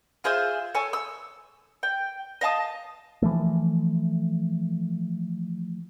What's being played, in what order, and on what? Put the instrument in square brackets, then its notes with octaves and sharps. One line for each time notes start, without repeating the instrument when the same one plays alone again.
[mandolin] F4 G#4 C5 E5
A4 C#5 G#5
E6
G5
D#5 F5 A5 D#6
[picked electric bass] E3 F3 A3